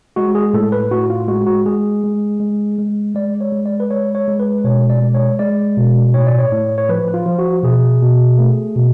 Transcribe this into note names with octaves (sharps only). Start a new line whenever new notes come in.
G#3 F#4
G#4
A2 A4
B4
A2 F#4
F4
G#3 F#4
F#4
G#3 G#4
G#3
G#3
G#3
G#3 D5
C#5
G#3
D5
B4
G#3 C#5
C#5
G#3
B4
B2 C#5
D5
G#3
C#5
G#3 D5
B2
A2 C#5
D5
C#5
A2
C#5
F3 B4
F4
F3
F#4
B2 G#4
B2
A3
B2